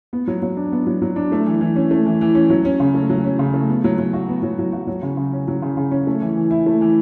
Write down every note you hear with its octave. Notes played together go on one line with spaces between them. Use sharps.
B3
F#3
F#3
D4
B3
F#3
F#3
D4
A3
E3
E3
C#4
A3
E3
E3
C#4
F#3
C#4
C#3
A3
F#3
C#4
C#3
A3
B3
F#3
F#3
F#4
B3
F#3
F#3
F#4
F#3
C#3
C#3
C#4
F#3
C#3
C#3
C#4
A3
E3
E3
E4
A3
E3